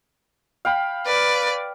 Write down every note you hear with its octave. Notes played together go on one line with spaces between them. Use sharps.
F5 G5 B5
B4 D5